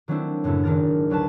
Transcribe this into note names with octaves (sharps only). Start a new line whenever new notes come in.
D#3 F#3 A3 C4 D4 E4
F#2 A2 C#3 A3 E4
G#1 D#3 D4 A#4 A6
D2 F#3 B4 A5